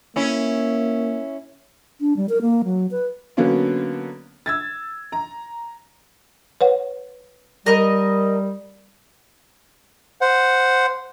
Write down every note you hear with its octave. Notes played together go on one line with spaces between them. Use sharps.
A#3 C#4 E4
D4
G3
A#4
A#3
F#3
B4
D3 F#3 A#3 B3 C#4 D4
E6 G#6 A6
A#5
B4 C#5 F#5
G3 A#4 D#5
C5 F#5